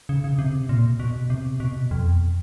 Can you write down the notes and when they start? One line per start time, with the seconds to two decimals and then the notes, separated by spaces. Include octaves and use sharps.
0.09 C#3
0.24 C#3
0.39 C3
0.69 A#2
1.00 B2
1.30 C3
1.60 B2
1.91 F2